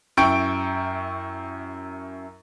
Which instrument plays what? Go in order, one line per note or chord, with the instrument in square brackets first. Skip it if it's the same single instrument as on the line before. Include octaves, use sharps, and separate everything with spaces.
[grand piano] F#2 E4 G5 C#6 G6 D7